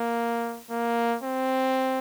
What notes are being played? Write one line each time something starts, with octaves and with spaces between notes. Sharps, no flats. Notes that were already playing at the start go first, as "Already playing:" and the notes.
Already playing: A#3
A#3
C4